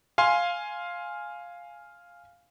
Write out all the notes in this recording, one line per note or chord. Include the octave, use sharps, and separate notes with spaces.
F5 G#5 C6